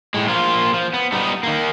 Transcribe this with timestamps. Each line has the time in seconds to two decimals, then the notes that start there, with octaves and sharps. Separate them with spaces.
0.14 A2 G#3
0.28 F3 A#3 F4
0.74 F3
0.94 B3
1.12 G3 B3 D#4
1.43 D#3 A#3